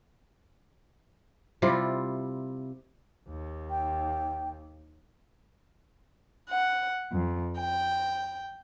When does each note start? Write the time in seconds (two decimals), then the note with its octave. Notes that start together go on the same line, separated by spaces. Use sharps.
1.62 C3 G3 E4 F4
3.28 D#2
3.70 G5
6.50 F#5
7.13 F2
7.58 G5